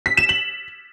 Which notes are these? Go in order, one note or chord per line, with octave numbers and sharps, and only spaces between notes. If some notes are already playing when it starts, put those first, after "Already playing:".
B6
E7
F#7